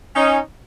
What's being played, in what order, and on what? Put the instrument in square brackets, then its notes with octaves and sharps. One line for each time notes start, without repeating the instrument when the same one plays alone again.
[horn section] C#4 D#4